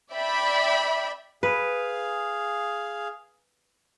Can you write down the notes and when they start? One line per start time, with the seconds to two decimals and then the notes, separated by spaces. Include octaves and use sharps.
0.12 D5 E5 G5 B5
1.43 G#4 B4 F5